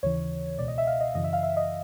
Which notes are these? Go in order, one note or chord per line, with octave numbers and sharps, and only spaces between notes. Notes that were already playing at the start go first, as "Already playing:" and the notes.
D#2 C#3 E3 C#5
C#2 B2 D5
D#5
E5
F5
D#5
F#2 C#3 E3 D#5
E5
F5
E5
D#5